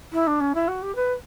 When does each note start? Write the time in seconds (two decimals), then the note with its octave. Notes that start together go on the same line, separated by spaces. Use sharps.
0.12 E4
0.27 D4
0.40 C#4
0.54 E4
0.68 F#4
0.82 G4
0.95 B4